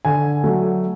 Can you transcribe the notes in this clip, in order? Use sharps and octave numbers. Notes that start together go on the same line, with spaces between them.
D3 G#5
F#3 A3